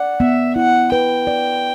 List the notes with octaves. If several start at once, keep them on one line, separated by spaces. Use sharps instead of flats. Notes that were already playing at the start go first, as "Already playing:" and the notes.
Already playing: D5 F#5
B3 E5
E4 F#5
B4 G5
D5